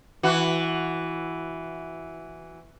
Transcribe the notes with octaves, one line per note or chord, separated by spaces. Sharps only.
E3 F#4